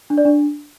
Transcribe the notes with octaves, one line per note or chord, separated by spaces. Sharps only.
D4
D5
D4